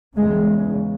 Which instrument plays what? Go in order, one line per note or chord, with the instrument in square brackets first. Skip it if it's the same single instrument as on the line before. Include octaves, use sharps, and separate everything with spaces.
[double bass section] E2 C#3 G#3